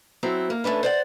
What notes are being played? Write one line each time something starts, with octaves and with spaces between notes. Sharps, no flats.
F#3 C4 E4
A#3
A3 C#4 D4 B4
C5 D5 F#5